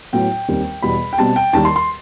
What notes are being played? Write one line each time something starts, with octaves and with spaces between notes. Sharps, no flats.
A2 F#3 B3 G5
D#2 D#3 G3 C4
E2 B2 G3 B5
G5
B2 G3 C4 A5
G5
D#2 D#3 G3 A5
C6
C6